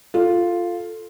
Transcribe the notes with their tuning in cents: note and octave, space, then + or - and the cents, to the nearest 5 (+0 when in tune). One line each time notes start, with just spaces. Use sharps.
F4 +0 A4 +0